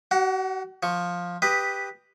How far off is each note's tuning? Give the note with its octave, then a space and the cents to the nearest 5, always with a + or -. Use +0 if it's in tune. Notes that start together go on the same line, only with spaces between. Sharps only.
F#4 +40 F#5 +0
F3 +10 C#6 +0
G4 +5 B4 +0 D#5 +0